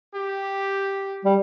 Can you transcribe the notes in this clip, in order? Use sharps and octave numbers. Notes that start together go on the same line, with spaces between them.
G4
G3